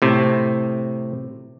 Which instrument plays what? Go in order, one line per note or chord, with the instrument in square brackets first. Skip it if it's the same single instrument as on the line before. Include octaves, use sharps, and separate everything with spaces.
[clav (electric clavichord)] A2 C3